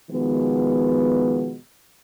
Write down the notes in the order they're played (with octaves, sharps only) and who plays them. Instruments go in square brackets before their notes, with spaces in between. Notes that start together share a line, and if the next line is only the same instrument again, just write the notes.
[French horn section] B2 D#3 F3 G#3 B3